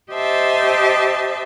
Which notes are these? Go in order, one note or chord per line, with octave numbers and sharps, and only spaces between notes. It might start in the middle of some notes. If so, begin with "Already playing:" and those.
G4 C5 D#5 E5 A5